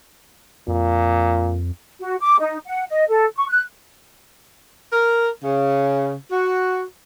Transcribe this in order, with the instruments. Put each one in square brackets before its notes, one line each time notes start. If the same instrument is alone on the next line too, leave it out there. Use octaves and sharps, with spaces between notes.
[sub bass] F2 [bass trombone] A#2
[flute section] F#4
D6
D#4
F#5
D#5
A4
C#6
F#6
[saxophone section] A#4
C#3
F#4